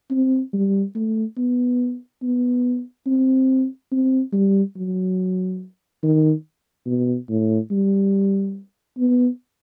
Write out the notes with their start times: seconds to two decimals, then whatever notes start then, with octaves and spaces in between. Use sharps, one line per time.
0.11 C4
0.54 G3
0.95 A3
1.38 B3
2.23 B3
3.07 C4
3.92 C4
4.33 G3
4.76 F#3
6.03 D#3
6.86 B2
7.29 A2
7.71 G3
8.98 B3